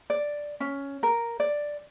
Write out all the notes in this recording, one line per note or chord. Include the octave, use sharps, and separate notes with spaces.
D5
C#4
A#4
D5